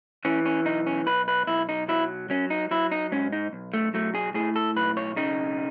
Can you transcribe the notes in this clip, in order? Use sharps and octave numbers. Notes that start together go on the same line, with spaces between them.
E3 C#4
C#4
B1 D#4
C#4
B1 B4
B4
B1 E4
D#4
F#3 E4
F#3 C#4
D#4
F#3 E4
D#4
G#2 C#4
D#4
B1
A3
F#3 A3
G#4
A2 G#4
A4
B1 B4
C#5
C#3 D#4